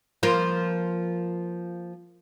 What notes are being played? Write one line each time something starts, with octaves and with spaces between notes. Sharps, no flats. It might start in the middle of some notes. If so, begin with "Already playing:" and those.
F3 A#3 F4